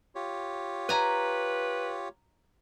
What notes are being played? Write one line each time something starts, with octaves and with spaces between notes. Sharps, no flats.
F4 G4 C#5
B4 G#5 A#5